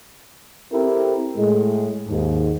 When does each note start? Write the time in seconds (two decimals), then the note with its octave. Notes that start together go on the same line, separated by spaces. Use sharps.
0.71 C4 E4 G4 A4 A#4
1.37 A2 G#3
2.09 D#2 G#2